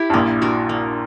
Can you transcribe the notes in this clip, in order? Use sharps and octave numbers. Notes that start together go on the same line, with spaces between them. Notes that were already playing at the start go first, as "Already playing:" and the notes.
Already playing: E4 G4
G2
A#1 A#2 A#3
D4 F#4 A#4
A#3